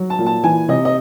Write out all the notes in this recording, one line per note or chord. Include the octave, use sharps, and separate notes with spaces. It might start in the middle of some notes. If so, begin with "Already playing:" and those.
Already playing: F#3
A5
A#2
A5
E3 G#5
C3 D#5
D#5